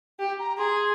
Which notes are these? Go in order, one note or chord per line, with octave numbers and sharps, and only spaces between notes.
G4 G5
A#5
G#4 C6